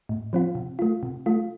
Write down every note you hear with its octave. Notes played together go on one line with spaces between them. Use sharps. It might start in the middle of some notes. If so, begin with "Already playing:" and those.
A2
F3 C4 F4
C3
A3 F4
C3
A3 F4